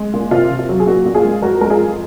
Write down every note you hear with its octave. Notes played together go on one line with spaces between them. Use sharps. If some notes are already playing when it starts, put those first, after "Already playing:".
Already playing: G#3
A#2
C3 F4
C3
F4
F#3
G#4
A#2 F#4
A#2
F4 G#4
G#3
F2 F#4 A#4
G#3 A#4
F4 G#4
F2